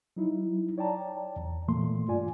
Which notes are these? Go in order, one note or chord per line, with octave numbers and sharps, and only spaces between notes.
F#3 D#4 E4
C#5 D5 G5 A5 A#5
E2
A#2 E3 A3 A#3 C6
G2 F4 D5 G#5